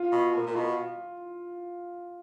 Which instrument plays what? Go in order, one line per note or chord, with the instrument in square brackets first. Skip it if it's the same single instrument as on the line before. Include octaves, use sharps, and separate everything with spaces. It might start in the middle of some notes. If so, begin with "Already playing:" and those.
Already playing: [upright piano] F4
[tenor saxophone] B2
A#2
A#2
B2